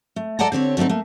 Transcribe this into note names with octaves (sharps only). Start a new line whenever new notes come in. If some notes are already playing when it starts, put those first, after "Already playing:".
A3
A4 D5 D#5 F#5 A5 A#5
D3 C4 G4 C#5
D3 A3 A#3 C4 D#4
A3 A#3